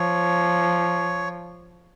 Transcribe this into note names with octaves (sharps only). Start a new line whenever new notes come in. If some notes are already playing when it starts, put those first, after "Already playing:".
Already playing: F3 C#5